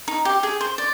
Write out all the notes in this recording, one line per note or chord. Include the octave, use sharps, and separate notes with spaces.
D#4
G4
G#4
C5
D5